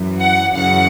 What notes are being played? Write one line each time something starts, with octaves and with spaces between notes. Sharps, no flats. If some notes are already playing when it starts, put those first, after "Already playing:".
Already playing: F#2 E3
F#5
F#2 C#3 E3 F#5